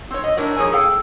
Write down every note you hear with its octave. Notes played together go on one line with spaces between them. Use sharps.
C4 C#5
D#5
A2 D4 A#4 C#5 D5
F2 G#4 A#4 C#5 G#5
G#4 A4 F5 G5